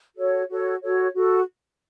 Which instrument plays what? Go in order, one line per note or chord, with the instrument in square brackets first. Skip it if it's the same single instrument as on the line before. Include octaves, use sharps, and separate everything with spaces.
[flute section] F#4 A4 C#5
F#4 A4 C#5
F#4 A4 C#5
F#4 A4